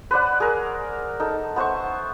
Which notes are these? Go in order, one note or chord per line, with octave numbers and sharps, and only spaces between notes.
B4 C5 D5 F#5
G#4 A#4
D#4 A4
B3 C5 E5 C#6